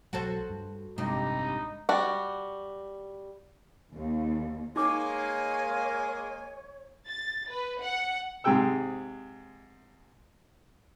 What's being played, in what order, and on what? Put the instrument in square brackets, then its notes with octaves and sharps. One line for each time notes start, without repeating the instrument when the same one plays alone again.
[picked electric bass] B1 F#3 [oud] F#4 A4 C5
[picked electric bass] G2
[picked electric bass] A1 G#3 [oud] G2 C3 [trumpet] D#4
[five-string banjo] G3 F#4
[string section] D#2
[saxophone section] G#3 A#3 [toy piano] D#4 D6 [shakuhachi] C#5 [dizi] G#5
[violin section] A6
B4
F#5
[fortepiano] G#2 C3 G#4 G5 E6